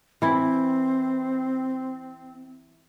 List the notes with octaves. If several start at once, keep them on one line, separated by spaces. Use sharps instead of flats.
E3 C4 E4